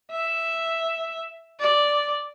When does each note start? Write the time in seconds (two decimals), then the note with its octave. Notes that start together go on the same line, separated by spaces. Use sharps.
0.12 E5
1.60 D5